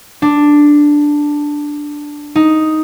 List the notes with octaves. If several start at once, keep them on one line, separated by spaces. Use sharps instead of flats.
D4
D#4